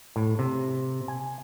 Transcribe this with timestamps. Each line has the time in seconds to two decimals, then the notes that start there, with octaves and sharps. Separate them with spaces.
0.16 A2
0.39 C3
1.08 G#5